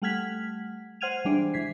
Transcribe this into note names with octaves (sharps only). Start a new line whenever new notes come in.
G3 A3 F#5 F6 G#6 B6
C5 F#5 F6 G#6 D#7 F7
E3 G3 G#3 D4 C5 D5
E3 G#6 B6 C7